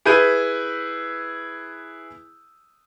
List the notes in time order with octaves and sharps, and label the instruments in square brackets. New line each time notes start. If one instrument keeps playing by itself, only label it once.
[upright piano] E4 G#4 B4 G6 D#7